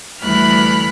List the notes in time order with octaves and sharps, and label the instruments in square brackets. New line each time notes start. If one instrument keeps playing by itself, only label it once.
[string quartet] D2 E3 G3 B5 F6 F#6